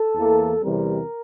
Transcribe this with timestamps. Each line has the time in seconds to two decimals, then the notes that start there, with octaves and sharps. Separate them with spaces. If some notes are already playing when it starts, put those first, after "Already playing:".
Already playing: A4
0.14 E2 E3 A#3
0.62 E2 C3 E3 G3 C4 A#4